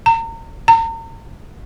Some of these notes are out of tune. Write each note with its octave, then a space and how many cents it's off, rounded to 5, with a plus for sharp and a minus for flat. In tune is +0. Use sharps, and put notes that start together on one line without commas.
A#5 -35
A#5 -40